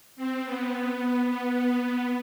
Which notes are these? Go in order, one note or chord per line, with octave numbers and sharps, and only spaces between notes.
C4
B3
B3